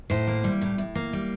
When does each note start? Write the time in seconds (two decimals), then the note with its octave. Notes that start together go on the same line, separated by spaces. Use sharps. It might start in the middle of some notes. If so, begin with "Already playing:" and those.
0.10 A2 C5
0.27 A#3
0.44 G3
0.61 A2
0.78 A2
0.95 A#3
1.13 G3